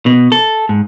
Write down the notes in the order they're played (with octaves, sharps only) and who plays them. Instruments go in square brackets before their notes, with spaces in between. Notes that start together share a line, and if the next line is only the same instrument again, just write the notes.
[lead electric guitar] B2
A4
G#2